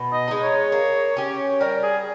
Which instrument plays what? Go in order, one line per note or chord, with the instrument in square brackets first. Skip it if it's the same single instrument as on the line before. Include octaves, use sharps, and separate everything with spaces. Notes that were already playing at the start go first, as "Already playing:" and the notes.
Already playing: [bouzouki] B2
[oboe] D#5
[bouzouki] G#3 D#4
[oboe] C#5
[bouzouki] A#3
C#4 G4
[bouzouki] G3 [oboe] A#4
[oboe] G#4